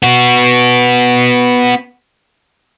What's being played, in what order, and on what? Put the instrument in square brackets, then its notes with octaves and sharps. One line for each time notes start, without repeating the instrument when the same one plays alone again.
[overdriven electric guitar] B3 F#4